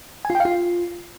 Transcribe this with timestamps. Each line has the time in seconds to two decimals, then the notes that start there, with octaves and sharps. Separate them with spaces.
0.25 G#5
0.30 F4
0.35 G5
0.40 F5
0.45 F4